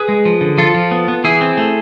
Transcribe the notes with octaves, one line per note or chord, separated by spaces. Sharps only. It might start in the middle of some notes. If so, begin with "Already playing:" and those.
Already playing: G#4 B4
G#3
F3
D3
F3 F4 A4
F3
B3
B3
E3 E4 G#4
C4
A3